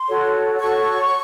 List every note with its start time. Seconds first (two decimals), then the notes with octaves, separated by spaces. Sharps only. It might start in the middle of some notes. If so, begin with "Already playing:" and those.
Already playing: C6
0.09 F#4 A4 C#5
0.59 F#4 A4 C#5 C#6